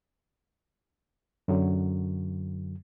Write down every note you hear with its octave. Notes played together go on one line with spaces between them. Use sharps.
F#2 D3 F#3